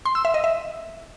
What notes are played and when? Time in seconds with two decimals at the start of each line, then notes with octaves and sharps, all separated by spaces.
0.06 C6
0.15 E6
0.25 E5
0.34 D#5
0.44 E5